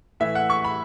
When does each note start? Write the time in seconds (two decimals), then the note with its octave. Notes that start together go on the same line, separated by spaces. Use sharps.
0.20 A2 E3 E5
0.35 F#5
0.50 C#6
0.64 B5